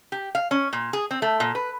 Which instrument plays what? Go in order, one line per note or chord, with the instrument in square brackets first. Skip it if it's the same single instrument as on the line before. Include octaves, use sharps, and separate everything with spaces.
[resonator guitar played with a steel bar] G4
F5
C#4
A#2
G#4
C4
A3
A#2
B4